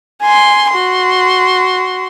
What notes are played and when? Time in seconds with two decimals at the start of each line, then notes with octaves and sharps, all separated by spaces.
0.22 G#5 C6
0.72 F#4 C6